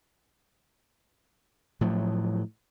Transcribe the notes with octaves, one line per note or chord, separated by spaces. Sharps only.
A2 F3 F#3